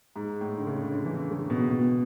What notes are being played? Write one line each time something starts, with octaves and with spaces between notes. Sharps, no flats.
G#2
A2
D3
C#3
D3
E3
D3
C#3
B2
B2